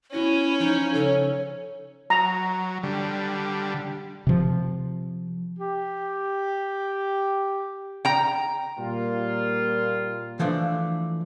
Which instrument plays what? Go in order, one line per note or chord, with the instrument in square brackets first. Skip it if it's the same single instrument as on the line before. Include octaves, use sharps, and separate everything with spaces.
[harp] B3 F#4 A#6 [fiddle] C#4 [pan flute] E4
[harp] F3 D7 [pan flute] D#4
[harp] C#3 [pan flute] A4
[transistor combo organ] F#3 [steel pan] A#5
[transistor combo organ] D3 G3
[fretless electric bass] C3 F3
[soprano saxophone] G4
[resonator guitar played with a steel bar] G5 A#5
[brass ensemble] A#2 G3 A#3 F4
[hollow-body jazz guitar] E3 F3 A3 D4